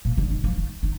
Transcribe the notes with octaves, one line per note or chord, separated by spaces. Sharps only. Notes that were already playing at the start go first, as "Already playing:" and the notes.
A#2
D3
D#3
F3
D#3
D#3